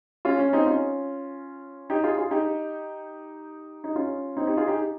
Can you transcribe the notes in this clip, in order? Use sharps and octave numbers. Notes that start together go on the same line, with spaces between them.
C#4 F4
C#4
C4 D#4
C#4 F4
D#4 G4
F4 G#4
F4 G#4
D#4 G4
D#4
C#4 F4
C4 D#4
D#4 G4
F4 G#4
D#4 G4